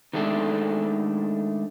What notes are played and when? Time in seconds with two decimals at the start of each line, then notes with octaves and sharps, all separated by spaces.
0.13 D#3 G#3 A3 D4 A4